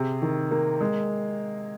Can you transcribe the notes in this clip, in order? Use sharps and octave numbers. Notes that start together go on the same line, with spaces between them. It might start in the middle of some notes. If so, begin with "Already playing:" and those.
Already playing: C3 G#4
D#3
A#3
G#3